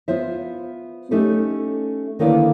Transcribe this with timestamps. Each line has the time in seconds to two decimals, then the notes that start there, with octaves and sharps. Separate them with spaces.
0.08 B3 F4 C5 E5
1.11 A3 C#4 D#4 G4 A4
2.19 D3 D#3 A#3 E4 B4 D5